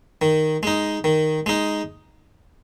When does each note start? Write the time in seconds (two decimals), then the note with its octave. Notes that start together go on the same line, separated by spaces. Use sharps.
0.22 D#3
0.63 G#3 D#4
1.04 D#3
1.46 G#3 D#4